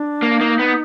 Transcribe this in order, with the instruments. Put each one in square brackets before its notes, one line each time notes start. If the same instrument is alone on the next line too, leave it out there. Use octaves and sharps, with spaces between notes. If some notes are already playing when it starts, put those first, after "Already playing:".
Already playing: [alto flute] D4
[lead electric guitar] A#3
[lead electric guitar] A#3 [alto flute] D#4
[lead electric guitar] B3